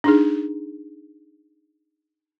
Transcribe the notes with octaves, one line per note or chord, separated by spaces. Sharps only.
D4 D#4 G#4